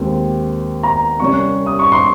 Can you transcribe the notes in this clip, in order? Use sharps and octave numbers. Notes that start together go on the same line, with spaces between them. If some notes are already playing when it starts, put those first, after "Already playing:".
Already playing: D#2 D#3 G#3 C4
A#5
C2 C3 G3 C#4 C#6
D#6
C#6
C6